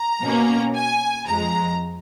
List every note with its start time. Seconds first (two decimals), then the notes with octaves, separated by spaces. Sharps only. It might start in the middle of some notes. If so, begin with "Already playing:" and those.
Already playing: A#5
0.22 B2 A#3 C#4
0.74 G#5
1.26 F2 F3 G#3 A#5